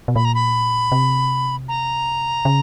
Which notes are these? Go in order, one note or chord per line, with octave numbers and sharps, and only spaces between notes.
B2
A#2 B5
A#5
B5
C3
A#5
C#3